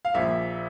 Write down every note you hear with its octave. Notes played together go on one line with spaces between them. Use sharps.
F5
A#1 A#2 F3 E5